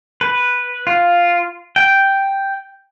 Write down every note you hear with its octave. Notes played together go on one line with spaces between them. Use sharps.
B4
F4
G5